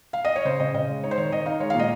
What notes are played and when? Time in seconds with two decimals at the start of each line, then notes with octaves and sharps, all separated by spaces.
0.13 F5
0.25 D#5
0.36 C#5
0.45 C#3 C5
0.59 C#3 D#5
0.74 C#3 D#5
0.89 G#3
1.03 D#4 C#5
1.11 C5
1.18 D#3 C#5
1.32 D#3 D#5
1.46 D#4 F5
1.60 G#3 C#5
1.70 F5
1.75 A#2 D#5